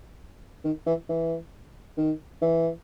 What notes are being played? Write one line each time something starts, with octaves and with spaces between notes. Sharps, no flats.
D#3
E3
E3
D#3
E3